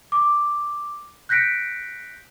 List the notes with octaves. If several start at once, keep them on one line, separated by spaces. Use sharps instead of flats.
D6
F#6 G6 A#6 B6 C#7 D7